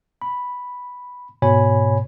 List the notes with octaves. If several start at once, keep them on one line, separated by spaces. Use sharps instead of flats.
B5
G#2 B2 C#5 G#5 B5